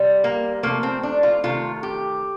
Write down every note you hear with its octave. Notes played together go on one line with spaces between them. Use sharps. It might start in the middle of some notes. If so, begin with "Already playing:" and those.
Already playing: C3 G3
A#3
C3 F3 A3 A#3
C4
D4
F4
C3 D#3 A3 F4
G4